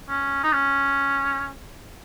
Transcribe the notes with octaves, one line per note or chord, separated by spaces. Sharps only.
C#4
D#4
C#4